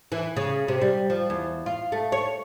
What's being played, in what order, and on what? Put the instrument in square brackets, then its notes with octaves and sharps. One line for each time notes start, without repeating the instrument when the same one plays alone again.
[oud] E3
C#3
C3
G3
F3
E2
F4
A3
C#5